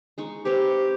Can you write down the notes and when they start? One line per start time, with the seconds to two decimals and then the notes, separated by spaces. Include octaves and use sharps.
0.18 G#3 D#4 C#6
0.45 C4 G4 B4 C#5